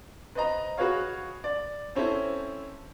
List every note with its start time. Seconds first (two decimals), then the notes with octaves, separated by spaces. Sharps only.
0.35 B4 C5 D#5 A#5
0.77 F#4 G#4 B4 C#5 F5
1.44 D5
1.95 C4 C#4 E4 A4 C5